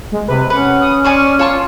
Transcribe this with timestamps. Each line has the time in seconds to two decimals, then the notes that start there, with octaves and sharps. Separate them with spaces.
0.12 G#3
0.28 C3 B4
0.50 C#4 B4 F#5
0.81 D#6
1.04 C5 D5 G#5 C#6
1.39 F4 C#5 A5 C#6